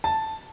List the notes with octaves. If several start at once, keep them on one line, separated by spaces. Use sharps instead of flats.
A5